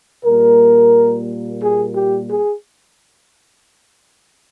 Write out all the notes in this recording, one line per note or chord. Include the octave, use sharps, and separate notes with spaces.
A#2 G3 A#3 A#4
G#4
G4
G#4